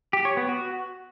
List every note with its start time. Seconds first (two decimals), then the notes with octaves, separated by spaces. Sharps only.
0.13 G4
0.25 C#5
0.37 B3
0.49 F#4